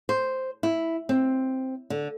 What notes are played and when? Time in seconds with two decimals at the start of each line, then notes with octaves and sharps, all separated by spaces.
0.09 C5
0.63 E4
1.09 C4
1.90 D3